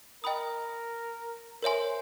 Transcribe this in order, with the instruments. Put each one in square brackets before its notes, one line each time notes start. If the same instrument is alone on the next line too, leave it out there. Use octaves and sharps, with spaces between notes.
[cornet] A#4 [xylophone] D#5 G5 B5 D#6
[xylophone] A#4 C#5 E5 G#5 C6 [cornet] C5